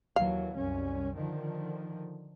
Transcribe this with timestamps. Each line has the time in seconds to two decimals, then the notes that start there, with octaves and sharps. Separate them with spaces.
0.16 D#2 E3 F#3 F5
0.56 C2 F#2 C#4
1.13 D3 D#3 F3